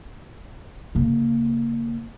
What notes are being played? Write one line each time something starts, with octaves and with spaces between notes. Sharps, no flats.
C#3 A#3